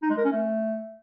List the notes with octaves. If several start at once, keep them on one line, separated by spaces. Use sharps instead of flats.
D#4
G#3
A#4
C#4
A3